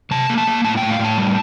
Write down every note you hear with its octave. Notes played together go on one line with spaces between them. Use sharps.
C3 A5
A#3
A5
A#3
A2 A5
A2 G5
F5
A2 A5
G3